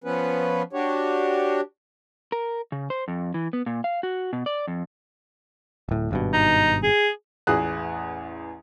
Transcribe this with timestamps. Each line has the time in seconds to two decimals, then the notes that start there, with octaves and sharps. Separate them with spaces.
0.04 F3 B3 C#4 B4
0.73 D4 F#4 G4 C#5
2.32 A#4
2.72 C#3
2.90 C5
3.08 F2
3.34 E3
3.53 B3
3.66 A#2
3.84 F5
4.03 F#4
4.33 B2
4.46 D5
4.67 F2
5.89 D1 A2
6.11 G#1 G2 B2
6.33 D#4
6.83 G#4
7.47 A1 E2 G#4 D#6 F#6